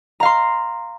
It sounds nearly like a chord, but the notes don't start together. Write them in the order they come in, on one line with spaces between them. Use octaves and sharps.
A#5 F5 C6